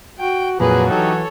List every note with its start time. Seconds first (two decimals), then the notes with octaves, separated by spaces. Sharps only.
0.20 F#4 G5
0.60 F2 A#2 F#3 F#4 G#4 B4
0.91 E3 D#4 G4 A4 C#5